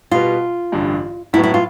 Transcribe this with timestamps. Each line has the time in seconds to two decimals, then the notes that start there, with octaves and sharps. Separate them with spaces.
0.11 B2 G3 B3 F4
0.72 A1 G2 D3
1.33 A2 F#3 B3 E4
1.43 E4
1.54 F4